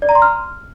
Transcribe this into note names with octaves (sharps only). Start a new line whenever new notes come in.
D5
A#5
C6
F6